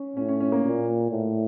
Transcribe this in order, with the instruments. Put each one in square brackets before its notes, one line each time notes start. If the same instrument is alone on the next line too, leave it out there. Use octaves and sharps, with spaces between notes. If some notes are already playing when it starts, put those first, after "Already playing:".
Already playing: [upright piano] C#4
[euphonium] A2 [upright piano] C#4
[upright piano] C#4
C#4
A#3
[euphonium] A#2
A2